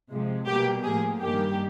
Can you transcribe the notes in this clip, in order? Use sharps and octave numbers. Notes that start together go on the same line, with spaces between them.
C3 F3 G#3
B2 G3 A#3 G4
A2 F3 A#3 G#4
G2 D#3 G3 A#3 G4